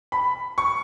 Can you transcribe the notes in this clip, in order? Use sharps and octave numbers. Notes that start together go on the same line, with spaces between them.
B5
C#6